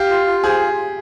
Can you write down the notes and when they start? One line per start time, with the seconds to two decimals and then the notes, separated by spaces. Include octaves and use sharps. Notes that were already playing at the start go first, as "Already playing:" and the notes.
Already playing: G4 F5
0.10 F4
0.27 F4
0.43 G#4 C5